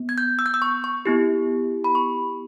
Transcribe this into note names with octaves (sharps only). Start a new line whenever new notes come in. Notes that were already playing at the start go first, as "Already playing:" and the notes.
Already playing: B3
G#6
G6
E6
G6
E6
C#6
C#6
B3 E4 G4
B5
C#6